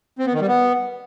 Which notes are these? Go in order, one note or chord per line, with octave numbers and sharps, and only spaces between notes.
C4
B3
D#3
G3
B3